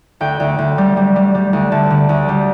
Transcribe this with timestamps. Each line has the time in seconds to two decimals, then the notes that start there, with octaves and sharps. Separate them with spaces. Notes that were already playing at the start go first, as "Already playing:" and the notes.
0.21 D2 G5
0.40 D2
0.59 D2
0.78 G3
0.97 G3
1.16 G3
1.35 G3
1.53 D2
1.72 D2 A5
1.91 D3
2.09 D2
2.29 G3